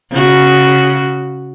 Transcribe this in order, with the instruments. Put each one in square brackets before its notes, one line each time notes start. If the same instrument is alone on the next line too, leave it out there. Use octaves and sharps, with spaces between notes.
[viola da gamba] C#3 F#4